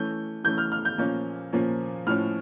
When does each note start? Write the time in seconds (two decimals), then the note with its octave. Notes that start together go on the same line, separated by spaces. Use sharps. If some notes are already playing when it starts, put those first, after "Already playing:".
Already playing: E3 A3 C#4 G6
0.44 E3 A3 C#4 G6
0.58 F6
0.72 F6
0.85 G6
0.98 A#2 F3 A#3 C#4
1.53 A#2 F3 A#3 C#4
2.07 A2 F3 C#4 F6